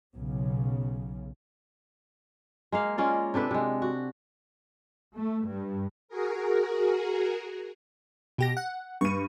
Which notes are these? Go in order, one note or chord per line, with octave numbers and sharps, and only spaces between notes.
B1 C#3
G#3 A#3 F5
G#3 C#4 F4 D5
C3 D4 A4 B4
C3 G#3
F#4
A3
G2
F#4 G#4 A#4
B2 G4 A#6
F#5
G2 C#6 D#7